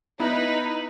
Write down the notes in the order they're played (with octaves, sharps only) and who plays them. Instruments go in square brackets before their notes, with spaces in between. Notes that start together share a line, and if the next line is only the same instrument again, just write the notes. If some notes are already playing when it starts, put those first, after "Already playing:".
[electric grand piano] B3 E4 [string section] D#4 [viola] B4 B5